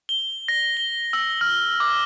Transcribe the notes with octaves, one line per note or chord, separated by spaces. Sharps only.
G7
A#6
G7
E6
F6
D6